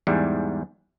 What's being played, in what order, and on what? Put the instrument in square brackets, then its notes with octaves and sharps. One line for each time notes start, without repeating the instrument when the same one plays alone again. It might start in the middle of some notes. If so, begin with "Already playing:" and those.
[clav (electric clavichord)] E2 G#2 G3